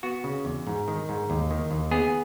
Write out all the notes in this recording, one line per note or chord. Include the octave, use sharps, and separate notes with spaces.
B3 F#4
C#3
E2
G#2
D#3
G#2
D#2
D#3
D#2
B3 G#4